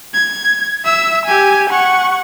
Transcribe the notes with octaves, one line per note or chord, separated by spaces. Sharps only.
G#6
E5 E6
G4 G#5
F#5 C#6